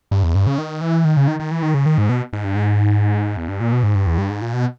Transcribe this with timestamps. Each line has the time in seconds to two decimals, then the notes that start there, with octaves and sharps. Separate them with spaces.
0.11 G2
0.23 E2
0.35 G2
0.47 C#3
0.58 D#3
0.81 E3
1.05 D#3
1.17 C#3
1.28 D#3
1.40 D#3
1.51 E3
1.62 D#3
1.74 C#3
1.86 D#3
1.98 G#2
2.09 B2
2.33 G#2
2.44 G2
2.55 G#2
3.37 E2
3.49 G2
3.60 A#2
3.72 B2
3.83 G#2
3.95 G2
4.07 E2
4.18 G2
4.30 G#2
4.42 A#2
4.53 B2